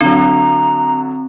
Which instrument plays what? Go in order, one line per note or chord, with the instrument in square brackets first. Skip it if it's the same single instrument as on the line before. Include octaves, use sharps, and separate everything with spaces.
[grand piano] D3 F#3 [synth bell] C4 [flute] A#5